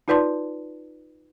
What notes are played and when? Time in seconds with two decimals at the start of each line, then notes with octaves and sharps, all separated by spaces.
0.08 D#4 F4 B4 D5 A5 C6